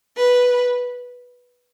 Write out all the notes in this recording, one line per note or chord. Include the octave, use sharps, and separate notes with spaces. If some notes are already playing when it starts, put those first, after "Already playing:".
B4